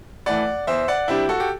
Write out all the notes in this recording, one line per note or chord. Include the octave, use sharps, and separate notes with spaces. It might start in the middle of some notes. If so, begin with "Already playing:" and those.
A2 E3 A3 D5 F#5
E2 C5 E5
D5 F#5
C3 G3 D4 E4 G4
F#4 A4
G4